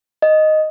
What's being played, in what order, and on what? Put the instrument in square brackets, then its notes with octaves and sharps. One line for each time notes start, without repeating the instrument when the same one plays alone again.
[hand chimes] D#5